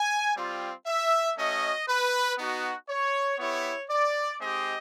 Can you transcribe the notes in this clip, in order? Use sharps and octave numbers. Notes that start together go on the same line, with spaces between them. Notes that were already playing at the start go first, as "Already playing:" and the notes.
Already playing: G#5
G3 C4 F4
E5
A3 C#4 F#4 D#5
B4
B3 D#4 F#4
C#5
B3 E4 G4 C#5
D5
G#3 C4 D#4 G4 D#5